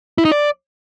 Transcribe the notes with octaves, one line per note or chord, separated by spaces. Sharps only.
E4
D#4
D5